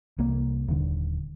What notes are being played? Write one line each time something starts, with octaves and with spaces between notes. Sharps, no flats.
C2 C3 A#3
D#1 D3